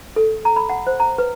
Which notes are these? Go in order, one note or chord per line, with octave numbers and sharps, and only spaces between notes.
A4
A#5
B5
F#5
C5
A#5
B4